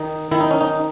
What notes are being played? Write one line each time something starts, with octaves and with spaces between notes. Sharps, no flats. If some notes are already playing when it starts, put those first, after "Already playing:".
Already playing: D#3 D#4
D#3 E4
D#4
C#4
D#4